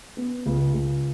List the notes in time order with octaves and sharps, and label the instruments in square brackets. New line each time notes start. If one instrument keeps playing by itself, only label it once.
[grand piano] B3
C#2
C#2